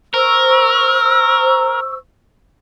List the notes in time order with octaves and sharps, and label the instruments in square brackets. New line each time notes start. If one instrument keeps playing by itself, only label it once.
[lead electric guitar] A#4 [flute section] C5 C#6 E6